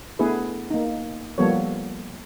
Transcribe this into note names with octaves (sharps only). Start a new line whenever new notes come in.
A3 B3 D4 E4 G#4 B4
A#3 D#4
F3 G3 A#3 B3 A4 C#5